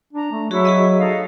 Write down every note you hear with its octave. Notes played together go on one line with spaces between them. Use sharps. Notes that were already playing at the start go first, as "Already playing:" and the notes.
D4 A#5
A3
F#3 E4 F#4 G#4 E5 C#6
F#4 G#4 D#5
D#4 A4 F5